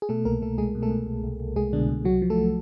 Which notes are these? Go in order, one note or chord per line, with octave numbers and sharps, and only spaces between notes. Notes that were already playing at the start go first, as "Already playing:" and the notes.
G#4
B2 A3 A4
C2 A#3 A#4
C2 A3 A4
C2 G#3 G#4
B2
A3 A4
B2
C2
C2
C2
C2 G#3 G#4
B2 D3 D4
B2
C2 F#3 F#4
F3
A3 A4